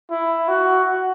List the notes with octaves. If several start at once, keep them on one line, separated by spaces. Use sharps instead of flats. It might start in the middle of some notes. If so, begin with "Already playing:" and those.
E4
F#4